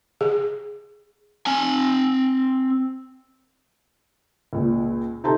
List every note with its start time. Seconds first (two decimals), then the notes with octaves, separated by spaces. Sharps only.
0.21 G#4
1.46 C4 G#5
4.53 C#2 A#2
5.24 C3 D#4 A4 A5 C6 G6